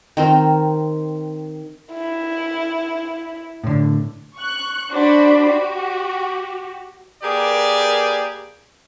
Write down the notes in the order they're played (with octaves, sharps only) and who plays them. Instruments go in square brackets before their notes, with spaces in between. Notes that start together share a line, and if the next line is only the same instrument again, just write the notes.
[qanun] D#3 C4 A#4
[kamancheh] E4
[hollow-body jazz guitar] A2 D3
[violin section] C#6 F#6
D4 F#4 C5 D5 B5
F#4 G4
[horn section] A#3 G4 G#4 A#4 B4 D5